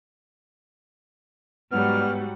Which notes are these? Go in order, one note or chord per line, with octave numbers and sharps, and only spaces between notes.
G#2 F#3 G3 B3 F#5 F6